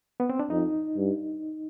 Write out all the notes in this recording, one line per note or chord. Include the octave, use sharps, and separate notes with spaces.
B3
C4
D4
F2 D#4
G2